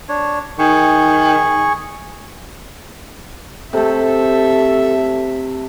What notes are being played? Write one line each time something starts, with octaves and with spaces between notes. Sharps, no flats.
D4 C#5
D#3 G#4 C#6
C3 A3 A4 E5